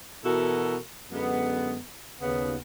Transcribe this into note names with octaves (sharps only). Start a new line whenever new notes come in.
B2 E3 E4 F#4 A4 A#4
F#2 D3 G#3 B3
D#2 C#3 B3